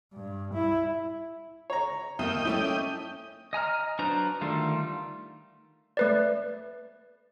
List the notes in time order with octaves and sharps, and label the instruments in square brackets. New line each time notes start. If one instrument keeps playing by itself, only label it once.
[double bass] G2
E4
[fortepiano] C#5 A#5
[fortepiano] D#2 [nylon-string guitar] A#4 E5 [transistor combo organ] D#5 G5
[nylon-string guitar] A3 C#4 D5 [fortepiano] E4
[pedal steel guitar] D#5 G#5 A#5 F6
F#3 D4 B4 C5 A#5
D3 D#3 G3 A3 F4
[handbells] A3 B4 D5